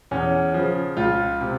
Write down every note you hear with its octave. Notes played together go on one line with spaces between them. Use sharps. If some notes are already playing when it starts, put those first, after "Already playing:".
E2 C#4
C#3 F3
C#2 F4
C3